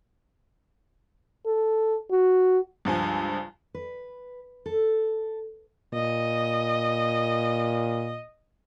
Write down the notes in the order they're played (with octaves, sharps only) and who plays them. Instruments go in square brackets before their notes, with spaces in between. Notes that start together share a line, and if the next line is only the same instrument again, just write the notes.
[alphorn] A4
F#4
[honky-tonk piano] C#2 G2 F3 G#5
[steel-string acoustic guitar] B4
A4
[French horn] A#2 [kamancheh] D#5